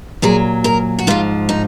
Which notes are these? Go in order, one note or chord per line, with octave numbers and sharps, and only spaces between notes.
A#2 F#3 G#4
A#4
F#4
G#2 F3 F4
D#4